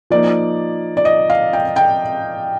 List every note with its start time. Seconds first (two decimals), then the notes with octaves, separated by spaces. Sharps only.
0.10 F3 A#3 D#4 D5
0.97 D5
1.05 D#5
1.30 F5
1.53 G5
1.76 G5